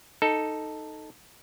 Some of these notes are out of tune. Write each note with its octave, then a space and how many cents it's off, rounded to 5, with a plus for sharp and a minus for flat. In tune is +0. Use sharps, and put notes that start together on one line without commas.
D#4 +0 A4 +0